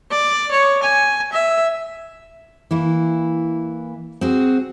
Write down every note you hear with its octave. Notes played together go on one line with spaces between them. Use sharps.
D5
C#5
G#5
E5
E3 A#3 E4
C4 F#4 G#4